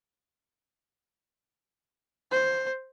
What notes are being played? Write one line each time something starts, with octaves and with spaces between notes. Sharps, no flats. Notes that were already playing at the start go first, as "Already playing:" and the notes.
C5